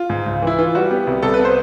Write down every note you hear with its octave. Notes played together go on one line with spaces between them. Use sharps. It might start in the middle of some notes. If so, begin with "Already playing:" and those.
Already playing: F4
G#2
C#2
E3 E4
E3 F4
G3 F#4
B3 G4
C2
C2 A4
B4
B3
C5